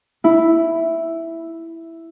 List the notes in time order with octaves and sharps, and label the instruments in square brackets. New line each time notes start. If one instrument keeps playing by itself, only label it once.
[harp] E4